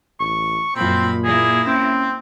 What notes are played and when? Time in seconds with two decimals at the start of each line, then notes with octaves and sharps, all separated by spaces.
0.20 A1 C#6
0.76 F#2 A#2 F3 C4 B5
1.24 A#3 E4 G#4
1.67 C4 C#4